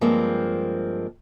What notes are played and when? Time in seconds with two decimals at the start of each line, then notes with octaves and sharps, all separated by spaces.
0.01 G2 F3 G#3 A#3 C4